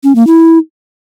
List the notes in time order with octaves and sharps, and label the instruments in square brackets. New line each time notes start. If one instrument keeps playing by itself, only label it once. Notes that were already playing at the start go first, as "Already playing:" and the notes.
[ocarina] C#4
A#3
E4